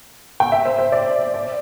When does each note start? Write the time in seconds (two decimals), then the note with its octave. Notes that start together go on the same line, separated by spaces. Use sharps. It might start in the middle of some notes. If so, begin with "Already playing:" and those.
0.40 G5
0.52 E5
0.65 C5
0.78 C5
0.92 D5
1.34 D5